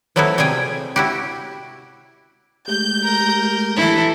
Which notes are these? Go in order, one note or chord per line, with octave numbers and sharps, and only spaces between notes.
F3 F#3 A3 B3 E4 F#4
C3 G3 C4 G#4 G5
E4 F#4 G4
G#3 A3 G4 G6
A#4
E3 E4 A4